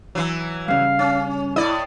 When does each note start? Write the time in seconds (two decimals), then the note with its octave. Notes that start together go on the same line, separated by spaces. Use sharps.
0.15 E3 F#3
0.68 G2 C#3 F5
0.99 C#4
1.56 A2 E4 D5 D#5